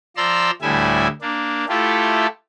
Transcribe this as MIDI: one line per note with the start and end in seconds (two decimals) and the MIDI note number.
0.16 0.51 53
0.16 0.51 74
0.16 0.51 82
0.16 0.51 84
0.16 0.51 88
0.62 1.08 38
0.62 1.08 45
0.62 1.08 55
0.62 1.08 64
0.62 1.08 76
0.62 1.08 80
1.22 1.65 58
1.22 1.65 62
1.69 2.27 57
1.69 2.27 64
1.69 2.27 65
1.69 2.27 67
1.69 2.27 69